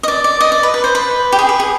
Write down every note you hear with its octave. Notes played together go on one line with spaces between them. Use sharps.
D#5
D5
D5
D#5
D5
B4
B4
C5
B4
G4
G#4
B4
G#4